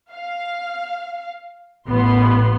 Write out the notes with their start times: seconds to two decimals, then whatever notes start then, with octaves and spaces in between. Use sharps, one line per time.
0.12 F5
1.87 A1 B3 C6